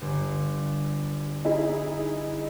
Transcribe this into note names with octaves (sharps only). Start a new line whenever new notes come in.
G1
D#4 E4 G#4